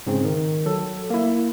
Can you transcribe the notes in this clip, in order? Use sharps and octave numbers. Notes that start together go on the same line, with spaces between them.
G#2 C#3 C4
D#3
F#3 A4
A#3 E4